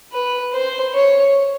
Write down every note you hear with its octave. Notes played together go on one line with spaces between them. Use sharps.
B4
C5
C#5